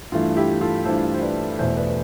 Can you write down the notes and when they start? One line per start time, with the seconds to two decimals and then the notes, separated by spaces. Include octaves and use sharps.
0.12 G2 E3 A3 F4
0.36 E4 G4
0.61 F4 A4
0.85 G2 E3 A3 A4 C5
1.14 C5
1.22 B4 D5
1.59 E2 B2 A3 C5 E5
1.77 B4 D5
1.88 B4